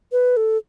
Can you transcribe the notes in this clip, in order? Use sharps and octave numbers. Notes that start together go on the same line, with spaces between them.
B4
A4